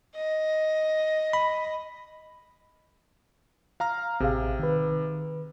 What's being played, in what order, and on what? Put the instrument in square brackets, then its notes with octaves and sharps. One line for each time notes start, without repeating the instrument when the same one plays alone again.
[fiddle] D#5
[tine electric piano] B5
[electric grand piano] F5 A#5 F6
[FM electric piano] A1 G#4 F5 [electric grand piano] C3
[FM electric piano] D#3 B4